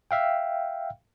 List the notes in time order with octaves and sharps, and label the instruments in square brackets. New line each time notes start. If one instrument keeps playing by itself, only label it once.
[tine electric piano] E5 F5 G5